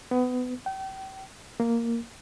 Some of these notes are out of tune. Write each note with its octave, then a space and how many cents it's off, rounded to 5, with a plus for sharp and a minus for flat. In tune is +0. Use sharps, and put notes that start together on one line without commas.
B3 +25
G5 -35
A#3 -5